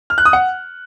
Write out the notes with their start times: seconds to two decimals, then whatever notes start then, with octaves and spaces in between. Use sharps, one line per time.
0.10 F6
0.18 F#6
0.25 D#6
0.33 F#5